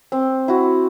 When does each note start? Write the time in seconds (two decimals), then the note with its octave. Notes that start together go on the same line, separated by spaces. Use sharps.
0.12 C4
0.48 E4 F#4